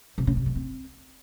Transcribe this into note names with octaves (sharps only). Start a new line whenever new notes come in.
C3
C#3
C3
A3
C4